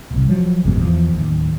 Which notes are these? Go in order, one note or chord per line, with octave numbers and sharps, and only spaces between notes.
D1 C2
F3 F#3
G1 F2 G#2 B2
E2 F3
D1 D#2